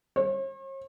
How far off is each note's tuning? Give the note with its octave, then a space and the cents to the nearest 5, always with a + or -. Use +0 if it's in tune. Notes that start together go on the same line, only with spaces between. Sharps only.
C#5 -45